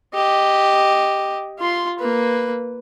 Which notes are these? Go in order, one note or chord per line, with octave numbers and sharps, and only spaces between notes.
G4 D#5
F4 C6
A#3 B4